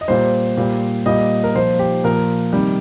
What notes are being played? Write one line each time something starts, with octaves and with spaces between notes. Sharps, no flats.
D#5
A#2 G3 C5
A#2 G3
A#2 G3 D#5
A#4
A#2 F3 C5
G4
A#2 F3 A#4
C3 D#3 G3